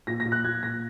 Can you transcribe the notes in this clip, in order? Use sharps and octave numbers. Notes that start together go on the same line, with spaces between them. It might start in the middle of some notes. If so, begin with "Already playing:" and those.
A#2 A#6
A#6
A#2
F#6
A#2 G#6
A#2 A#6